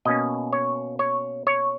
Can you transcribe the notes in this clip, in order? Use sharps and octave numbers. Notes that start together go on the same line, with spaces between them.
B2 A#3 C#4 D#5
C#5
C#5
C#5